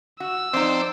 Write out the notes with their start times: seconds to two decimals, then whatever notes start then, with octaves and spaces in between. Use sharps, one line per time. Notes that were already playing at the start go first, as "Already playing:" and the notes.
0.20 F#4 E6
0.53 F2 C4 D#4 C5 D5